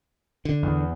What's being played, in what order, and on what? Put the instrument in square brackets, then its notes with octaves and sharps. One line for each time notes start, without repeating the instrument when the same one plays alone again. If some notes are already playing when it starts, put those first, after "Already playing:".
[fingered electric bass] D3
[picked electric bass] E2